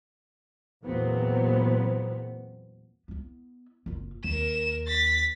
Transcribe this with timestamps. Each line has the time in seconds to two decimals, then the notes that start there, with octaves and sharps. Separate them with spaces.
0.83 E2 A#2 F#3 B3 C4
3.08 B3 E4
3.86 F#1 F4
4.24 D#2 A#4 E7
4.87 A6 B6